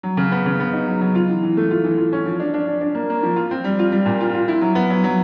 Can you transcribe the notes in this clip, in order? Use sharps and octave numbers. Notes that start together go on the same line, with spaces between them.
F#3
C#3
B3
C#3
B3
D#4
F#3
F#3
F4
E3
E3
A3
F4
E3
F4
C#4
F3
D4
D4
D4
D4
A#3
A#3
F3
F4
C4
G3
F4
G3
A#2
F4
F4
E4
F#3
B3
F#3
F#3